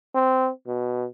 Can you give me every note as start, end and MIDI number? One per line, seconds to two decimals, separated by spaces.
0.15 0.50 60
0.67 1.06 47